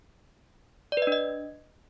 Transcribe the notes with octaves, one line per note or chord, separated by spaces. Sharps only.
D5
B4
D#5
D4
D#5